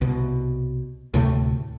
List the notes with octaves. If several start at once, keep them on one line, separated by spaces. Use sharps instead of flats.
C2 B2
D2 A2 C3 A3